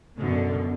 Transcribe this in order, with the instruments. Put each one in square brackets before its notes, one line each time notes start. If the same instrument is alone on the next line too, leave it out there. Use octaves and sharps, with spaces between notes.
[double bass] F#2 [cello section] B2 D3